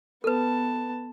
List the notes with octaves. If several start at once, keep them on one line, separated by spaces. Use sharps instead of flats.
B3 A4 B4 A5